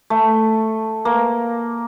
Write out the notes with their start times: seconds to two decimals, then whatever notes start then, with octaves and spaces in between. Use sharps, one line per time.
0.10 A3
1.05 A#3